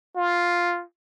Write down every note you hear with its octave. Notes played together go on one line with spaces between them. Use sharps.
F4